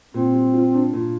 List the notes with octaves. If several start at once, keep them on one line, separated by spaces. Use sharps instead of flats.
A#2 C4
G3
F4
D4
A#2